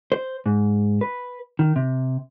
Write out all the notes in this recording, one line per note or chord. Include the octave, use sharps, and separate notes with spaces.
C5
G#2
B4
D#3
C3